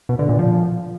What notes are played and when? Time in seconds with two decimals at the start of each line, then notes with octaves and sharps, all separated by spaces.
0.09 B2
0.19 D3
0.29 A#2
0.39 F3